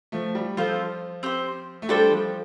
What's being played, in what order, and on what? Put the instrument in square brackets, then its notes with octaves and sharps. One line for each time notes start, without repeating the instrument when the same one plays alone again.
[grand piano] F3 A3
G3
[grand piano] F3 [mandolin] C4 F4 A4 C5
[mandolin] C4 G4 C5
[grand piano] A3
[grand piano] G3 [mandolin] D4 A4 C5 G5
[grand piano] F3